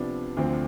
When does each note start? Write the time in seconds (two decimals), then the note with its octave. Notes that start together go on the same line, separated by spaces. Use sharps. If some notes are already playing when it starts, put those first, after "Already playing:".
Already playing: C3 F3 B3 D4
0.37 D2 D3 F3 C4